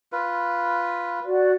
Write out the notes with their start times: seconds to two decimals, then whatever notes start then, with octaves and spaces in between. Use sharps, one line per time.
0.12 F4 B4
1.25 F#4 D5